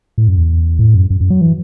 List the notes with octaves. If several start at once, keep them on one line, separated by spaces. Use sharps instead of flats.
A2
F#2
E2
A2
F#2
F#2
F#2
F#3
E3